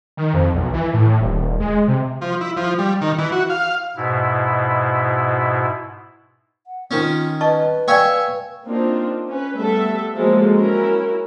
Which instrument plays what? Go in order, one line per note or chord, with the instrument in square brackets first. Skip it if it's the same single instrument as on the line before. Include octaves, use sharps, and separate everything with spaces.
[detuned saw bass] D#3
F2
B1
E3
A2
D#1
G#3
C3
[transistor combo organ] F3
E4
F3
G3
D#3
E3
F#4
F5
[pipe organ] G#2 B2 E4
[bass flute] F#5
[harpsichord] D#3 C#4 [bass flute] F4
[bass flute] B4 [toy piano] D#5 A5 C#6
[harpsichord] C#5 E5 G#5 [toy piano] D5 F5 G5
[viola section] A#3 C4 D4 D#4 F4
C#4 B4
G3 A3 B3 A4 E5
F3 F#3 G#3 A#3 A4
C#4 E4 F#4 A#4